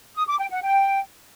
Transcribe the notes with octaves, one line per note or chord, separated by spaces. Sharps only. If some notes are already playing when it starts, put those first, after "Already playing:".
D#6
D6
G5
F#5
G5